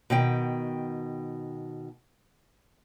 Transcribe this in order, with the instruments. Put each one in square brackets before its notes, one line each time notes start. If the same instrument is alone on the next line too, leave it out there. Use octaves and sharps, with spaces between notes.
[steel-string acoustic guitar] B2 D#3 G5